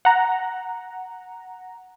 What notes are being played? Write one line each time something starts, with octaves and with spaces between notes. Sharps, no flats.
F#5 A#5